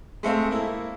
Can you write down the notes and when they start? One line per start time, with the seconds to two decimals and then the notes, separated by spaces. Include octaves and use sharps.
0.23 G#3 A3 C4 F5
0.51 A#3 E4